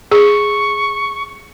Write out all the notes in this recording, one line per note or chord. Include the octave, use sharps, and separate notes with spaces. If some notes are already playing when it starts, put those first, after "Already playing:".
G#4 C#6